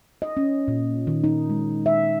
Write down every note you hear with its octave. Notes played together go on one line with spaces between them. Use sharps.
D#5
C#4
A#2
D#3
D#4
G#3
E5